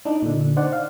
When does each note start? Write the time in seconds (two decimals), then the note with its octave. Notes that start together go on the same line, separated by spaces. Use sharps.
0.05 D4 D#4
0.22 A#2 D3
0.56 D4 D#4 C5 D5 F#5
0.73 F5